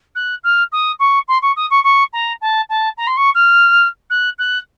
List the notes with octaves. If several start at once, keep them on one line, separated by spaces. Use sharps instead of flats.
F#6
F6
D#6
C#6
C6
C#6
D#6
C#6
C#6
A#5
A5
A5
A#5
C6
C#6
F6
F#6
F#6